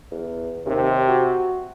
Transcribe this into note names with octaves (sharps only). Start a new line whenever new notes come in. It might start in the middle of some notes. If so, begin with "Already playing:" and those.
E2
D#2 C3
F#4